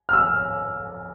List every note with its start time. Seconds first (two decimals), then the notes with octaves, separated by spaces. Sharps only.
0.09 F6
0.13 E6